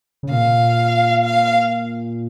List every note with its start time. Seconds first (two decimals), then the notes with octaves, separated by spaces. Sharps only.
0.23 C#3
0.30 A#2 F5
1.24 F5